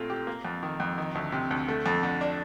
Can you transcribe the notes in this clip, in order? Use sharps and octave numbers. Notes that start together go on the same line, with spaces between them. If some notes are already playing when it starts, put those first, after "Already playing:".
Already playing: A#2 A3 C4
G4
A#3
F2
D#3
F2
D#3
D2
C3
D2
A3
F2
D3
D4